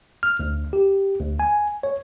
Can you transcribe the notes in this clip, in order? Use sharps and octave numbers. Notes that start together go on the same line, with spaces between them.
F6
D2
G4
D2
G#5
C#5